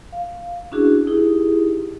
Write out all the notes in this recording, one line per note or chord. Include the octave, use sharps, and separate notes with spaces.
F5
C#4 D4 E4 F#4 G#4
D#4 E4 G4 G#4